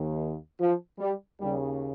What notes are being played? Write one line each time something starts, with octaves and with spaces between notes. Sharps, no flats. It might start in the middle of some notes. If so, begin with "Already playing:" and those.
Already playing: D#2 D#3
F3
G3
D#2 C#3 G3